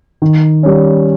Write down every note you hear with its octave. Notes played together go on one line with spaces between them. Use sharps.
D#3
G3 C#4